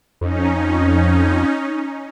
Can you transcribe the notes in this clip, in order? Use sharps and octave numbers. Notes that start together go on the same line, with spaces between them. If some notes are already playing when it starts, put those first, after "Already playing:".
F2 C#4 D#4